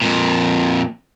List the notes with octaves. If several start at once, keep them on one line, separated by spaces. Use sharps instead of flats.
F2 A#2